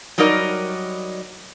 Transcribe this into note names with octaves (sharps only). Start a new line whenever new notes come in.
F#3 G3 D#4 A#4 D5 D#5